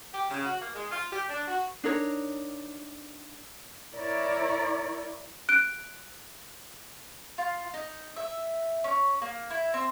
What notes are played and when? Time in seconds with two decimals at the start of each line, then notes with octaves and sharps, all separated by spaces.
0.12 G4
0.30 C#3
0.45 F#4
0.60 A#3
0.75 G#3
0.90 F4
1.11 G4
1.29 D4
1.47 F#4
1.84 D4 D#4 A#4 C#5
3.94 E4 A#4 C#5 D5
5.49 F#6 D7
7.38 F4
7.74 D#4
8.16 E5
8.84 C#4
9.22 A#3
9.50 E4
9.74 C4